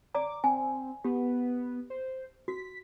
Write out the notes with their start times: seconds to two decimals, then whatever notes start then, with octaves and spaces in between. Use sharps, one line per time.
0.15 D5 A#5 D6
0.44 C4 G#5
1.04 B3 G4
1.90 C5
2.48 F#4 B6